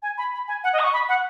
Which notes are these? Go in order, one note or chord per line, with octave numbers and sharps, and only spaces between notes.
G#5
B5
B5
G#5
F#5
D#5
D#6
C#6
B5
F#5